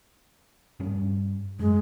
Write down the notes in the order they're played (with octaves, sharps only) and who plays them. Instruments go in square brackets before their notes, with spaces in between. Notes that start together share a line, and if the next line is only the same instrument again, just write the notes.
[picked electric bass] G2 G3 C#4
[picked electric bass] F#2 [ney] G#3